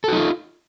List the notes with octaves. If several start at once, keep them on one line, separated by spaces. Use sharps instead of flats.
D#4 F4 F#4 A4